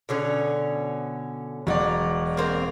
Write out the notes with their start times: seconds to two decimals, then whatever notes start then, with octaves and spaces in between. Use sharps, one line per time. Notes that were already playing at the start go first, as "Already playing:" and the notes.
0.09 B2 D3 C#4
1.67 E1 F#3 D#4 D5
2.37 A#3 C4 A#4